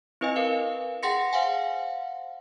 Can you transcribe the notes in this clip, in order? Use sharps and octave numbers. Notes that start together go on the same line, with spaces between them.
C4 E4 B4 D#5 G#5
A#4 B4 F5
G#4 F#5 G5 C6 A#6 C#7
C5 F5 F#5 G#5